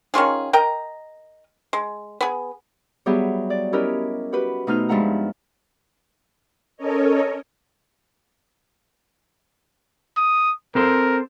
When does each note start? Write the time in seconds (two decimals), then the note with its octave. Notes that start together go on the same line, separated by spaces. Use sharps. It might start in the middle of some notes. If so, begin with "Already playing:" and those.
0.14 D#3 C#4 F4 G#4
0.53 A#4 D#5 G5 A#5
1.73 G#3
2.21 B3 G#4
3.06 F#3 G3 B3 G4 G#4 E5
3.50 D5
3.73 C#4 E4 G4 A#4 D#5
4.33 F#4 G4 B4
4.67 B2 A3 D#4 C5 F6
4.89 G2 F3 G#3 E5 F#5 A#5
6.77 C#4 A4 A#4 C#5 D#5
10.17 D#6
10.75 C4 A4 A#4 C5